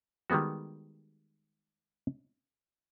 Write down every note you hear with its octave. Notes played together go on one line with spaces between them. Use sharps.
D#3 G3 G#3 B3 F#4